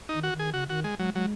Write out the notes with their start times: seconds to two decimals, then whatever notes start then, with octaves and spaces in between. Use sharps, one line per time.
0.09 D#3 D#4
0.23 F#4
0.33 D#3
0.39 G#4
0.54 C#3 F#4
0.69 D#3 F#4
0.84 G#3
0.99 F#3 G#3
1.15 F#3 G#3